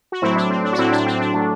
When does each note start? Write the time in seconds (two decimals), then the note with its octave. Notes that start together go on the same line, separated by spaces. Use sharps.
0.12 F#4
0.22 A2 F#3 A3 C4 E4
0.36 D4
0.50 C4
0.64 D4
0.73 F#4
0.78 A2 F#3 A3 C4 E4
0.92 D4
1.06 C4
1.20 D4
1.34 A2 F#3 A3